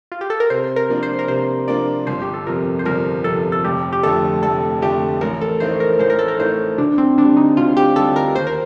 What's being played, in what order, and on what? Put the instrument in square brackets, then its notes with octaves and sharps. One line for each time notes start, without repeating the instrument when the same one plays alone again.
[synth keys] F4
G4
A4
A#4
[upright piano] C3 [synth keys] C5
[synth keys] A#4
[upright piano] F3 A#3 D4 F4
[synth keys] C5
A#4
[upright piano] C3 [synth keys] C5
[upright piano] F3 A#3 D4 F4 [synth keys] D5
[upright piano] G1 [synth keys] C5
[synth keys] G4
A4
[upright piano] F2 C3 F3 [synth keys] A#4
[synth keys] C5
[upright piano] G1 [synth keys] A#4
[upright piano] F2 C3 F3 [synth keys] A4
[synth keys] A4
[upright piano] F1 [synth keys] G4
[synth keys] G4
[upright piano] F2 D3 A3 [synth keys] A4
[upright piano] F1 [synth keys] A4
[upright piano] F2 D3 A3 [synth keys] G4
[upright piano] A1 [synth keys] A#4
[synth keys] A4
[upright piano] A2 A3 D#4 A#4 [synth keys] C5
[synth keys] A#4
[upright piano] A1 [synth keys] C5
[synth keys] A#4
A4
A#4
[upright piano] A2 A3 D#4 A#4 [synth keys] C5
[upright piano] D2 [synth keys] D4
[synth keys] C4
[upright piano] D3 G3 [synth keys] D4
[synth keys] D#4
[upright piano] D2 [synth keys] F4
[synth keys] G4
[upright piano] D3 G3 [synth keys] A4
[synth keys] A#4
[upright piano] D#2 [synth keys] C5
[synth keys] A#4